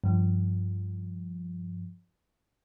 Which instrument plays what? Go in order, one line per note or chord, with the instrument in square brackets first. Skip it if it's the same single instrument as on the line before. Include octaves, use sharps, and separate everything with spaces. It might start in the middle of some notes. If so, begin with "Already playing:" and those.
[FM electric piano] G2 F3